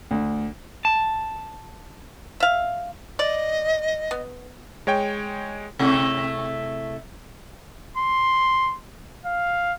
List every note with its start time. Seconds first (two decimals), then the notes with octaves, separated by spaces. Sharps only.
0.11 D2
0.85 A5
2.40 E5 F5
3.19 D5 D#5
4.11 B3
4.87 G#3 C#5 G5
5.79 C3 A3 E4
7.97 C6
9.25 F5